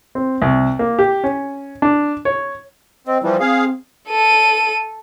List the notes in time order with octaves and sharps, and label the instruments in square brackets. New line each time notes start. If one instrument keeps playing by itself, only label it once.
[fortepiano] C4
C2
A#3
G4
C#4
D4
C#5
[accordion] C4 [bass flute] D#5
[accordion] E3 F3 G3 [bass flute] E4
[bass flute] C4 [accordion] G#4 F5
[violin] A4 D#7